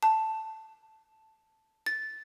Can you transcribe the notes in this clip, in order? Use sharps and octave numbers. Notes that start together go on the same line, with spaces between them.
A5
A6